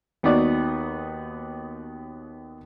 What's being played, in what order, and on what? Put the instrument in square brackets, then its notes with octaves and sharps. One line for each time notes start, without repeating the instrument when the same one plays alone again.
[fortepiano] D#2 B3 D#4 F#4 D5